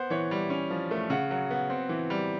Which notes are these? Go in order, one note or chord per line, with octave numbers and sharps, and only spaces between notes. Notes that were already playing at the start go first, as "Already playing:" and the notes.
Already playing: B3 C5
E3 C#5
G3
C#4
F3
A3
C#3 F#5
F#3
B3
C4
E3
G3